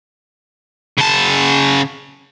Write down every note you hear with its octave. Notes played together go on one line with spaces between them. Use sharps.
C#3 A5